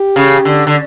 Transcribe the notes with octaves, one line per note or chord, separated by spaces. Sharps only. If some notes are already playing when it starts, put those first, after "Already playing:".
Already playing: G4
C#3
D3
D3